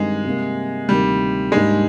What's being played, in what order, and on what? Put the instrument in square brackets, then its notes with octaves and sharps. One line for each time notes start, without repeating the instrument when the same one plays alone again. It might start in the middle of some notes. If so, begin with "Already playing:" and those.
Already playing: [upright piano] G2 D#3 G3 C4 D#4 [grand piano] G#3
[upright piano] C3 G3 A#3
[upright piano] D2 C3 D#3 A#3 [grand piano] G3
[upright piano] G#2 G3 A#3 D4 [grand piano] G#3